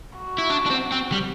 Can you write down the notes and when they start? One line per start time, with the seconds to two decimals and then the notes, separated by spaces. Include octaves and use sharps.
0.18 F#4
0.38 E4
0.50 D4
0.66 D4
0.70 C4
0.92 C4
1.12 G3